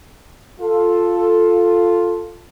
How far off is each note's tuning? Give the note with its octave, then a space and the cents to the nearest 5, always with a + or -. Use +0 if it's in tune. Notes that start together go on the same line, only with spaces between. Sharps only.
F4 +5 A4 +0